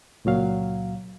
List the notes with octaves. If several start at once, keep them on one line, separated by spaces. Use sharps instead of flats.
C#2 A#2 F#3 F5